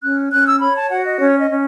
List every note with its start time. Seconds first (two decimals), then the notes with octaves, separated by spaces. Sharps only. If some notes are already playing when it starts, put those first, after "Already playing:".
0.02 C#4 F#6
0.32 C#4 F#6
0.46 E6
0.61 C#5 B5
0.76 A5
0.90 F#4 F#5
1.06 D#5
1.20 C#4 C#5
1.40 D#5
1.49 C#4